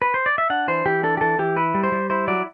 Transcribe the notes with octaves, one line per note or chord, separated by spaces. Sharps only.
B4
C5
D5
E5
D4 F#5
E3 C5
E3 G4
D4 A4
G4
E3 A4
E3 G4
E4 B4
G3
C5
G3
E4 C5
F#3 D5